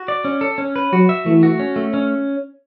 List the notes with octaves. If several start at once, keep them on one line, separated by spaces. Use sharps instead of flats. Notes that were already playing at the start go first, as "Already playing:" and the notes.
Already playing: F#4
D5
C#4
A4
C#4
B4
F#3 F#4
E5
E3 A3
F#4
C#4
A3
C#4